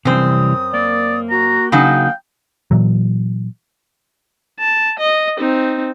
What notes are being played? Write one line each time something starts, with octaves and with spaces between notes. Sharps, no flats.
F#2 C3 E3 G3 C4 D#6
A#3 D5
F#4 A#5
C#3 F#3 D#4 F5 G5
A#2 E3 F#3
A5
D#5
C4 D#4